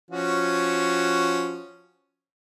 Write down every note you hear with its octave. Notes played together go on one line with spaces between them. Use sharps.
F3 C#4 F#4